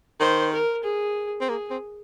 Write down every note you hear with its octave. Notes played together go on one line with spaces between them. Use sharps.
D#3 C5
A#4
G#4
C4
A#3 G#4
C4